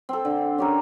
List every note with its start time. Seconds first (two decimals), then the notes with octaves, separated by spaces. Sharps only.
0.09 C4 A4
0.25 D3
0.58 C#4 G4 A#4